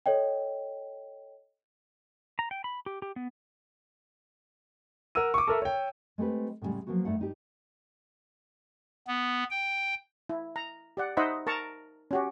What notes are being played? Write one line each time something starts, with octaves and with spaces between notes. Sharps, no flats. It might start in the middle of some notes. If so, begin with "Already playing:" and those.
A4 C#5 D#5 G5
A#5
G5
B5
G4
G4
B3
A#4 F#5 E6 D#7
C#6 D6
A4 A#4 E5
C#5 G5
G#3 A3 C4 G4 B4
A2 C#3 E3 G3 G#3
F3 F#3 A#3 B3 F#4
G2 A3 D#4 F#5
G2 D#4 G4
B3
G5
E4
A#5
G4 D5 F#5
D#4 C5 D#5 E5 F#5 B5
A#4 A5 A#5 C#6
C#4 F#4 G4